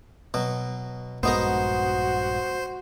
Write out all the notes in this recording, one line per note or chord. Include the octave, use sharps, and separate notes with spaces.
B2 F#3
A#1 G2 G#3 B3 D#4 F#4 A#4 C5